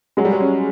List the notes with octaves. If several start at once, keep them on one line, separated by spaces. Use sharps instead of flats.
F#3 G#3
G3
F#3
C#4